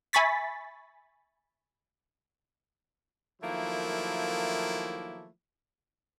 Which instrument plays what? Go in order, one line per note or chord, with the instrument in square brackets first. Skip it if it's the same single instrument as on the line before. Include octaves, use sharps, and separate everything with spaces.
[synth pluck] E5 G#5 B5 C#6 A6 B6
[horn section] D#3 F3 F#3 A3 A#3 E4